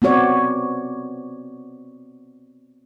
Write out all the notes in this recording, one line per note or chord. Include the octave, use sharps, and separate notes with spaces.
B3 C4 F#4 C#5 D5